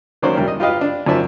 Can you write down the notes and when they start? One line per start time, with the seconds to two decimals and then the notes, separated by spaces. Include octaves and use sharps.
0.22 D#3 F#3 A#3 C#4 C5 D5
0.35 E2 G3 D4 G4 A#4
0.48 D#5
0.60 F4 G4 B4 D#5 F5
0.81 D4
1.06 F#2 D#3 F3 D5 E5 A5